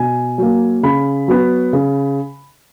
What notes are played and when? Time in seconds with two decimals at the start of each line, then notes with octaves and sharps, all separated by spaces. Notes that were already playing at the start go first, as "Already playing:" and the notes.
Already playing: B2 G#5
0.38 F#3 A#3
0.83 C#3 B5
1.28 F#3 B3
1.73 C#3